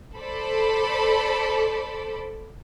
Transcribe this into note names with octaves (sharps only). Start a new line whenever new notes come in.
A4 C5 D5 B5